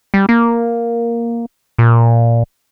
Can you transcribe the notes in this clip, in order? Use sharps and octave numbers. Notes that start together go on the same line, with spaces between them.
G3
A#3
A#2